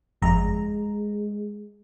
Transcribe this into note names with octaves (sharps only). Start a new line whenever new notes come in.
G1 F2 G#3 A#5